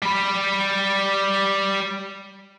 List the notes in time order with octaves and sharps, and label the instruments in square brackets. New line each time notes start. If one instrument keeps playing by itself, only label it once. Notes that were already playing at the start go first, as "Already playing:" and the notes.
[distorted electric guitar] G3 B5